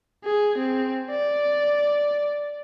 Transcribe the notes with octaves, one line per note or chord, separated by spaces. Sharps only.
G#4
C4
D5